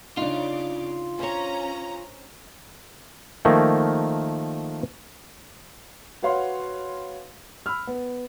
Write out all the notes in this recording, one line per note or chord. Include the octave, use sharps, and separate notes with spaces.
C#3 D4 D#4 F4 D6
C#4 C5 C#5 A#5
D#3 F3 A3 A#3
F#4 B4 C#5 F5 F#5 C6
B5 E6 F6
B3